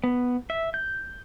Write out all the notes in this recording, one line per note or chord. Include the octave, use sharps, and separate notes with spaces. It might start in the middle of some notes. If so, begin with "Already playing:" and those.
B3
E5
G6